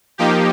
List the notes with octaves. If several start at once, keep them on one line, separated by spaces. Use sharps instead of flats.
F3 A#3 D#4 G4